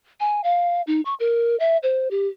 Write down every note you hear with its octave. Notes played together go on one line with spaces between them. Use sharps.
G#5
F5
D#4
C#6
A#4
E5
C5
G4